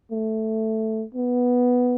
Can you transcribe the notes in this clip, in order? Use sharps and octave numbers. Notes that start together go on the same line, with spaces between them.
A3
B3